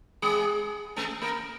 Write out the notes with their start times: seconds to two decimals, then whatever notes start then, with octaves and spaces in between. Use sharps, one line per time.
0.22 G#3 G#4
0.96 A3 A4
1.22 A#3 A#4